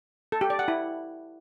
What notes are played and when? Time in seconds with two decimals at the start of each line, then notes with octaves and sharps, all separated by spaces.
0.32 A4
0.41 G4
0.50 D5
0.59 F#5
0.68 E4